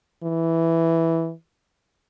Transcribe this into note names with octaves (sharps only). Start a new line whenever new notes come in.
E3